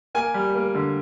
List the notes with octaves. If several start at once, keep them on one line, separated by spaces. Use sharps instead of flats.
A#3 G#5
G3
A#3
D3